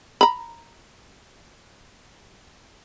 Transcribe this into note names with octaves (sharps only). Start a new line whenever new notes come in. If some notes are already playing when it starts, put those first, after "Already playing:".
A#5 B5